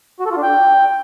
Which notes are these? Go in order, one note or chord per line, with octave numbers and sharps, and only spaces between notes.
F#4
A4
F4
D4
G5